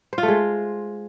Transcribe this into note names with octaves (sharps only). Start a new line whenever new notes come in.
C5
F4
A3
G#3